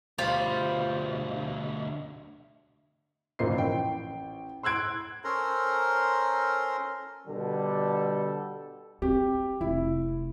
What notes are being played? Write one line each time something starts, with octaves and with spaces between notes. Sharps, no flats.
D2 B2 G3 F4 C5 B5
F1 F#2 A#2 C5 D#5 C7
A1 G5
C6 E6 F#6 G#6 D7
C#4 A4 A#4 C5 A#5 C6
B2 D3 G3 A4
C4 G4
F1 E4